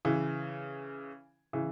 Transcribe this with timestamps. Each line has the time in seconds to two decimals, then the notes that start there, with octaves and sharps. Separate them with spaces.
0.05 C#3 E3
1.53 C#3 E3